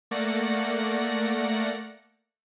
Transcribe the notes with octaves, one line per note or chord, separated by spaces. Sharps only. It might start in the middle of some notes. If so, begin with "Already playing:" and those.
A3 A#3 D5 F#5 A#6 C#7